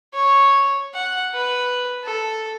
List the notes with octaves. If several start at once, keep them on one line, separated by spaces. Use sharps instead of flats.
C#5
F#5
B4
A4